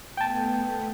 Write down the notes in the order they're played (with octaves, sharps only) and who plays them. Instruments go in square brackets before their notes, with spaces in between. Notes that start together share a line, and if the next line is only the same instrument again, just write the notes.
[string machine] A3 B3 [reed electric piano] G5 A5